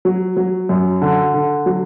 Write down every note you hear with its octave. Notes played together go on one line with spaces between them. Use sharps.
F#3
F#3
F#2
D3
D3
F#3